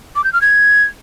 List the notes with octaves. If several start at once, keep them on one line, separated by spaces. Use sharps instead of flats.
D6
G6
F6
G#6